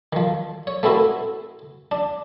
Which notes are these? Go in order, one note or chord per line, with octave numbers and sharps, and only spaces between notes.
D#3 F3
C#5
A3 B3 C4 E4 F#4 A#4
D4